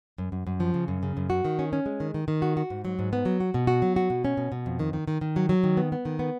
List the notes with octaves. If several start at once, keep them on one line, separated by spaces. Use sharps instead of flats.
F#2
F#2
F#2
F3
C#3
F#2
C#3
F#2
F#4
D#3
C#4
C#4
G#3
D#3
D#3
D#3
F#4
F#4
G#2
F#3
G#2
B3
F#3
F#4
B2
F#4
F#3
F#4
B2
C#4
B2
B2
F2
D#3
D#3
D#3
D#3
F#3
F#3
D#3
B3
B3
D#3
B3